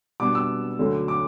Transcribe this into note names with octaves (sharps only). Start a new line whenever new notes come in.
B2 G3 B3 D4 D6
E6
D2 D3 F#3 A3 C#4
D6